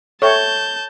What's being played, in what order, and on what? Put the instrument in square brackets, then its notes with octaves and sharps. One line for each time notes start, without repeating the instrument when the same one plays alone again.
[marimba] A4 E5 G5 [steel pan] C#5 [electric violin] A5 G6